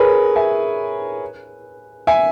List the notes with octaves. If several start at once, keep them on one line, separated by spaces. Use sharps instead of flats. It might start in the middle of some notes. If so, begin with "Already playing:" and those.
Already playing: G#4 A#4 B4 C#5
E5 G#5
E5 G#5